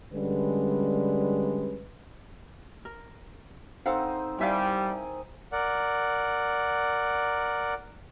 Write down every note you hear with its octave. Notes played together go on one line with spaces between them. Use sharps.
D3 G3 G#3 C#4 B4
A#4
C4 D#4 A4 C5 F5 F#5
G3 E4 A#4 E5 F5 G#5
A#4 D5 F#5